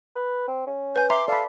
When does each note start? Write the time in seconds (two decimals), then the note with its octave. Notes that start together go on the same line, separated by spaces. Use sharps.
0.15 B4
0.48 C4
0.67 C#4
0.96 B4 G#5 G6
1.10 E5 A#5 C6 D6
1.28 A4 D5 F5 B5